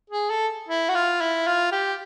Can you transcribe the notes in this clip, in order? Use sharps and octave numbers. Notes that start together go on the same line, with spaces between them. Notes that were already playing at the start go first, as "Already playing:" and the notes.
G#4
A4
E4
F#4
F4
E4
F4
G4